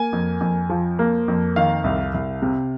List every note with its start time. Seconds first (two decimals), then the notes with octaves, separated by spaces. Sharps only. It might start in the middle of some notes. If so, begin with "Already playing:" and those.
Already playing: A#3 G#5
0.13 F2
0.41 F2
0.70 F3
0.99 A#3
1.28 F2
1.56 D#3 F5
1.84 C2
2.14 C2
2.42 C3